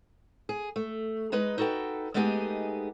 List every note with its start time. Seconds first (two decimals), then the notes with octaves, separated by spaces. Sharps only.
0.49 G#4
0.76 A3
1.32 G#3 D#4 B4 D#5
1.58 D#4 F#4 A4 B4 G5
2.14 G#3 A3 B3 D#4 G4 G#4